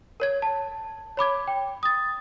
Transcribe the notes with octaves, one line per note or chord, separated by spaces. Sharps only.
A#4 C#5 G#6
A5
C#5 B5 D6 G#6
G5
D#6 A6